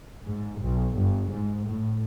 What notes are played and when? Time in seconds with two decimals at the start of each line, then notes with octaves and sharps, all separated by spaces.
0.25 G#2
0.61 B1
0.96 G1
1.31 G#2
1.66 A2